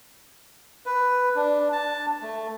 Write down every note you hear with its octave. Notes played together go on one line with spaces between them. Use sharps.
B4
D4
A5
A3